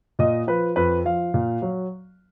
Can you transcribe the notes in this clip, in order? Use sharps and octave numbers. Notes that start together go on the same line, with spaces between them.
A#2 D#5
F3 B4
F2 B4
F3 F5
A#2
F#3